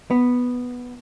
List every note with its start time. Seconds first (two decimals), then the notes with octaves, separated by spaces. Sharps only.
0.11 B3